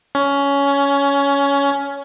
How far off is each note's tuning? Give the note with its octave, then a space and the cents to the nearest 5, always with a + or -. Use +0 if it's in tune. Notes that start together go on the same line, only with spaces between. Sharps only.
C#4 +15